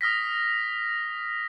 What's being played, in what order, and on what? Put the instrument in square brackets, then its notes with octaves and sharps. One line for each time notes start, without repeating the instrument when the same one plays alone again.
[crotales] D#6 F6 A#6 B6